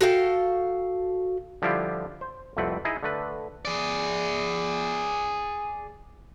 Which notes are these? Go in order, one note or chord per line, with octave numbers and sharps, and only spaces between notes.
F#4 A4 F5 G5
D3 F3 G3 E4 F4 G4
C5
C2 F2 A3 C4 B4 F#5
D#4 E4 G#4 D#5
D3 A3 B4
G#4 D5